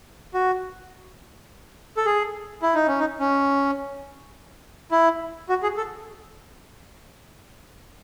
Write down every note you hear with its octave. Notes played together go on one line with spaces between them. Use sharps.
F#4
A4
G#4
E4
D#4
C#4
D#4
C#4
E4
F#4
G#4
A4